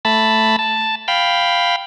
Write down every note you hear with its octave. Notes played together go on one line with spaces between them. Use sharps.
A3 A5 B5
A5
F5 G5 B5